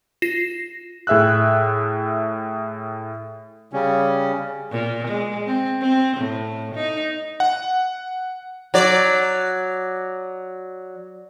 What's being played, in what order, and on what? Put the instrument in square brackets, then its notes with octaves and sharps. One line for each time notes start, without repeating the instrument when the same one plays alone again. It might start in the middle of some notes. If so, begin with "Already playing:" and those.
[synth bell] F4 A#6 C7 E7
[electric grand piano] A2 G#4 E5 E6 F#6
[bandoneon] C#3 G3 C#4
[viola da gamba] A#2
G#3
C4
C4
A2
D#4
[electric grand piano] F#5
[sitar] F#3 D5